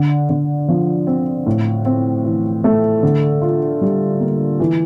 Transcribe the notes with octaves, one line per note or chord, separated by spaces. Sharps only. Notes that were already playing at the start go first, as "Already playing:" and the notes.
Already playing: D3
D3
F3
C4
A2
C4
E3
A3
D3
F4
G3
A#3
E3